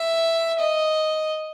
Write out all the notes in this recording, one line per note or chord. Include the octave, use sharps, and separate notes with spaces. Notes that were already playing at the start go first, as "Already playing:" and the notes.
Already playing: E5
D#5